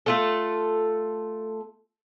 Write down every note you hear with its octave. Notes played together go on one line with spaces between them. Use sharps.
A3 F4 A4